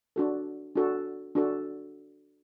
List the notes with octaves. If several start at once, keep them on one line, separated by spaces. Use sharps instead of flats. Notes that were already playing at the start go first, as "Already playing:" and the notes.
D4 F#4 A4
D4 F#4 A4
D4 F#4 A4